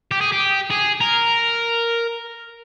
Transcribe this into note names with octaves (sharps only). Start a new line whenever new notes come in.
G4
G#4
G4
G#4
A#4